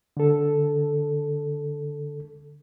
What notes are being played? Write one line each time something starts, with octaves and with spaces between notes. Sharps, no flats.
D3 A4